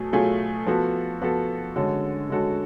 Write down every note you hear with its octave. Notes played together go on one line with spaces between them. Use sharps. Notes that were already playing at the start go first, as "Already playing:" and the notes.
Already playing: B2 F#3 A3 G#4
B2 F#3 A3 F4 G#4
F3 B3 F#4 A4
F3 B3 F#4 A4
D3 G#3 C#4 F#4 A4
D3 G#3 C#4 F#4 A4